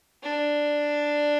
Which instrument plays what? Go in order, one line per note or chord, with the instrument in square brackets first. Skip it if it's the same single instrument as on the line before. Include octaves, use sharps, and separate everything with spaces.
[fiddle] D4